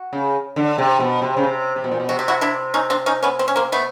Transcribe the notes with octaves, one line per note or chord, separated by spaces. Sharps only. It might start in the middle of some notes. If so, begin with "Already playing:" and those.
Already playing: F#4
C#3
D3
C3
B2
C3
C#3
C3
C3
B2
A#2
B2
C3 F#4
G4
E4 F#4
D4 E4
C#4 D#4
C4 D4
C#4 D#4
B3 C#4
C4
C#4
A#3 C4
A3 B3